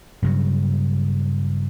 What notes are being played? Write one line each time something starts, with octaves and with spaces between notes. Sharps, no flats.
G2 C#3 F#3